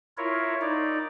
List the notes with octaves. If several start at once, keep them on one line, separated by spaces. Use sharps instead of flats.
E4 F4 A#4 C#5
D#4 D5